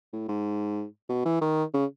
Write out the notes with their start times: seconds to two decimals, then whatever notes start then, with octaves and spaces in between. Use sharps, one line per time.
0.13 A2
0.29 G#2
1.09 B2
1.26 E3
1.41 D#3
1.74 C#3